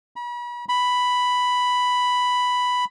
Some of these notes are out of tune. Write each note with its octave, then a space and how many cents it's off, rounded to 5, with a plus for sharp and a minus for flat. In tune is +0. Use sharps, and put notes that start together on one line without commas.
B5 -40
B5 +5